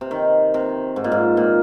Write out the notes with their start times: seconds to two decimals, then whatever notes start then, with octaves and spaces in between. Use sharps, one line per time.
0.01 C3
0.11 D#3
0.54 C3
0.96 G#2
1.04 A#2
1.12 G#2
1.37 A#2